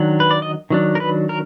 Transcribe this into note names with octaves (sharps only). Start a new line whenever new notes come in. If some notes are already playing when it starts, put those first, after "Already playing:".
Already playing: D#3 F#3 D4
B4
D5
D#5
D#3 F#3 D4
A#4
B4
A#4